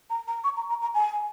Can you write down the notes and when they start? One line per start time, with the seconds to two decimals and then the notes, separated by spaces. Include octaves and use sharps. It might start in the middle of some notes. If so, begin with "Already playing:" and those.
0.10 A#5
0.27 A#5
0.44 C#6
0.57 A#5
0.69 A#5
0.82 A#5
0.94 G#5